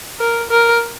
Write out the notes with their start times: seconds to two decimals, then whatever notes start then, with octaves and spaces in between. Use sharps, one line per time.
0.20 A#4
0.50 A#4